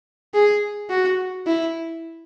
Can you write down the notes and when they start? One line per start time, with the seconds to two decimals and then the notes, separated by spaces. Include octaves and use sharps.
0.34 G#4
0.90 F#4
1.47 E4